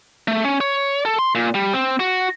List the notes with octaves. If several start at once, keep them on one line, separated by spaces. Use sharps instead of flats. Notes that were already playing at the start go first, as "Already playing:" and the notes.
A3
C#4
C#5
A4
C6
A#2
G3
C4
F#4